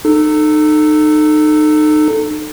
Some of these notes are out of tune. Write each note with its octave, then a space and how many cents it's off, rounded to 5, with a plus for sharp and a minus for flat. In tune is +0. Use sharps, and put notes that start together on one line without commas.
D#4 -30 A4 +0